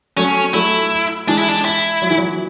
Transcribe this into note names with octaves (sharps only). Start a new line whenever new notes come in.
F#3 A3 C#4
F#3 A3 E4
E3 G#3 D4
E4
D4
E4
F#3
E3
F#3